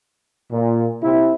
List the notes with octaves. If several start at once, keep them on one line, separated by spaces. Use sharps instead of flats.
A#2
C3 E4